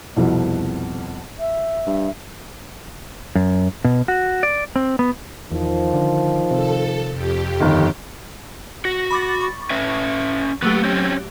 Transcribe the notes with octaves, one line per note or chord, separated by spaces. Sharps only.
C2 F2 B2
E5
G2
F#2
B2
F#4
D5
C4
B3
E2 D#3 F3
D3
C3 A4
F2 G4
G1 D#3
F#4 A#6
B5 D6 A6
C#6
C#4 B4 E5
F#3 A3 A#3 G4 B4
C4 C#4 C5